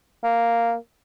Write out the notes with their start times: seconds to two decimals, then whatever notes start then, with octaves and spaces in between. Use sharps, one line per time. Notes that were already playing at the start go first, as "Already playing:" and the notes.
0.23 A#3